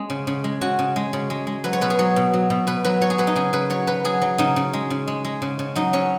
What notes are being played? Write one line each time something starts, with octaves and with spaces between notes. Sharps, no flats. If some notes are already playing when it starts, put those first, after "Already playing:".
Already playing: G#3 C#4
C#3
C#3
G#3
C#3 F#4
C#3
G#3
C#3
G#3
G#3
F#3 B4
C#5
B2 B4
G#4
F#3 C#5
B2
F#3
B2
B2 B4
F#3 B4
F#3 C#5
G#4
F#3 B4
D#4
C#3 G#4
C#3 B4
F#3 C#5
F#3 B4
F#3 G#4
F#3
C#3 D#4
C#3
G#3
C#3
G#3
G#3
C#3
C#3
F#3 D#4
F#3 C#4